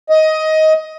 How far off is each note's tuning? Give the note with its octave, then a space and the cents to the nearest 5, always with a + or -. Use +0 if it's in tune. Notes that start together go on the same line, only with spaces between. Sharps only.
D#5 +15